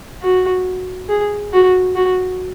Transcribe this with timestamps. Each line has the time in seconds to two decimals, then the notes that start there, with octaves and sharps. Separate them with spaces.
0.22 F#4
1.09 G#4
1.53 F#4
1.95 F#4